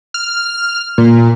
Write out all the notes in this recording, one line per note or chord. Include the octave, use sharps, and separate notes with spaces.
F6
A#2